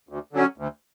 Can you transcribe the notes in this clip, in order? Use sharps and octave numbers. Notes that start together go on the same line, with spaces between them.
D2
D3 F#3 C#4
D2